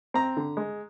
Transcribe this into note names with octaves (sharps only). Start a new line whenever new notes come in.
C4 A#5
D3
G#3